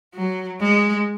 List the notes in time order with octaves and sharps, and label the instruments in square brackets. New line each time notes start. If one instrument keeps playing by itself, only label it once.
[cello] F#3
G#3